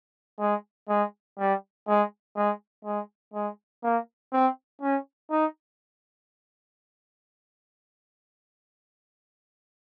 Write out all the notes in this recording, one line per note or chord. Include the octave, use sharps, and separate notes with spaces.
G#3
G#3
G3
G#3
G#3
G#3
G#3
A#3
C4
C#4
D#4